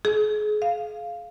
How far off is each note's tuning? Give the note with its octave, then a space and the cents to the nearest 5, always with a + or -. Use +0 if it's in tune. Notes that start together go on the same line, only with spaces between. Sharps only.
G#4 +35
F5 -5